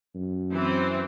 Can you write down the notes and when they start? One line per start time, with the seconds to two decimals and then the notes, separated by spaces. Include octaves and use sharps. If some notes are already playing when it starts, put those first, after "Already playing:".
0.15 F#2
0.53 E3 C4